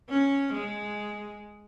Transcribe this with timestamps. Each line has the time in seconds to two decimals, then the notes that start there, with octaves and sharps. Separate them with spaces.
0.10 C#4
0.54 G#3